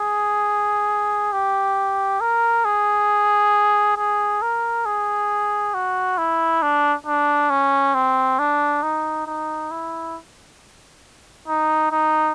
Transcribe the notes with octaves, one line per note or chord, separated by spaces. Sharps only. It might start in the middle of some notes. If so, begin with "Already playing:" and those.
Already playing: G#4
G4
A#4
G#4
G#4
A#4
G#4
F#4
E4
D4
D4
C#4
C4
D4
D#4
D#4
E4
D#4
D#4